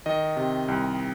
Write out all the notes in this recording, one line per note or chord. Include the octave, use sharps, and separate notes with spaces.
D#3 D#5
C3
C2